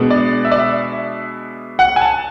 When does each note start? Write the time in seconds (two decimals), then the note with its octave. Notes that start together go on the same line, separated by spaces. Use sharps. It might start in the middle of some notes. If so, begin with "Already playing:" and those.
Already playing: B2 G#3 B3 D4
0.10 D5
0.45 E5
0.51 D5
0.58 E5
1.79 F#5
1.96 G#5
2.01 A5